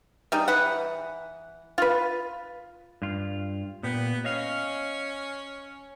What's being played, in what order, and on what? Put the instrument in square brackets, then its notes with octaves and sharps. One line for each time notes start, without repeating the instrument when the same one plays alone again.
[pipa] G3 D#4 G#4
E3 B4 F#5
F4 B4
[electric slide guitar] G2 F4
[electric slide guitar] A#2 G4 [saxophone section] B3
[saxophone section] C#4 C#5 [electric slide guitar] D#5 F5